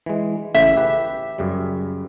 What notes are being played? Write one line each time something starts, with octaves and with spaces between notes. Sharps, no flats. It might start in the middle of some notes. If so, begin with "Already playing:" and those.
E3 G#3
A1 A2 C#3 E5
G4 B4
F#2 C#3 G3